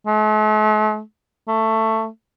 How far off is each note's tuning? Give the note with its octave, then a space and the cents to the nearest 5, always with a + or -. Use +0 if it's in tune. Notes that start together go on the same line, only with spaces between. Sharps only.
A3 -45
A3 +15